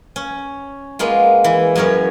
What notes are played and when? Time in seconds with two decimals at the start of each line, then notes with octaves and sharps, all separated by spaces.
0.16 C#4
0.99 G#3 A#3 B3 F4
1.44 E3 E4
1.76 F#2 B3 C#4 A#4 C#5